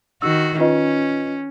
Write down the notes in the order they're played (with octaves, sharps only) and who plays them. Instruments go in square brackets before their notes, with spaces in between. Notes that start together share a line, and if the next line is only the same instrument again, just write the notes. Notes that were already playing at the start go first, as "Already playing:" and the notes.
[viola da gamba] D#3 F#4 [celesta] E6
[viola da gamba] C#4 [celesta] F4 B4 D#5